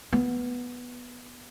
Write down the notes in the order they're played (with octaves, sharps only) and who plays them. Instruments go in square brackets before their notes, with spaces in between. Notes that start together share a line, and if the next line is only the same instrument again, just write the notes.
[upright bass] B3